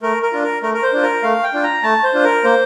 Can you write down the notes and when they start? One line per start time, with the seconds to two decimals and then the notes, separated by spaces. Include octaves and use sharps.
0.02 A3 A#4
0.23 A#4
0.32 D4 F4
0.43 A#4
0.63 A3 A#4
0.74 A#4
0.83 C5
0.93 D4 F4
1.03 A#4
1.23 A3 F5
1.43 G5
1.53 D4 F4
1.63 A#5
1.83 A3 A5
2.04 C5
2.13 D4 F4
2.24 A#4
2.44 A#3 C5